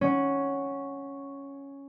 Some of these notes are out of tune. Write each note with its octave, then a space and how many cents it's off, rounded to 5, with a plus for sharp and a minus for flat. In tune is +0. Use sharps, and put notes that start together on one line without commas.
C#4 +0 F#5 +0